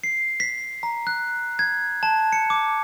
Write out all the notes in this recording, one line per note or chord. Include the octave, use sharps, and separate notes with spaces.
C7
B6
A#5
F#6
G#6
A5
C#7
D6